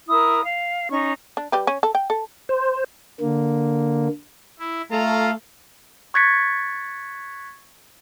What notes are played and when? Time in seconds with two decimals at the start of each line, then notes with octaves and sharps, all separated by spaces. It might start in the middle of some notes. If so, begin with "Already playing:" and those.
0.09 E4 A#4 D#6
0.44 F5
0.90 C#4 D#4 C#6
1.37 D4
1.52 G3 G4 B4
1.67 C#4
1.83 A4
1.95 G5
2.10 A4
2.49 C5
3.20 D3 A#3
4.59 E4
4.91 A3 F4 A4 F5 A#5
6.14 C#6 F#6 G#6 A6 B6 C#7